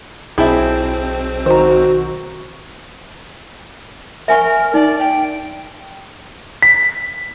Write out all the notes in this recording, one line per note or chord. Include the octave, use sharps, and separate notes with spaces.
B1 C4 E4 G#4 E5 G5 A5
D#3 F#4 C5 A#5
A#4 E5 G#5 C#6
D#4 D5
G5
B6